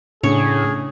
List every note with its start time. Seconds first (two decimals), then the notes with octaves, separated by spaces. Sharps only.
0.24 A2 C#3 C#4 D4 G#4 C#5